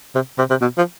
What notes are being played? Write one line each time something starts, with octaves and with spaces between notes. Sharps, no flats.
C3
C3
C3
B2
F3